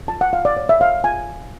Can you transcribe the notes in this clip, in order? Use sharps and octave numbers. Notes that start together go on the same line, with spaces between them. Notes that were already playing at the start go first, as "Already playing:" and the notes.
F4 A5
F#5
F4 F5
D5
C#5
E5
C#5 F5
F4 G#5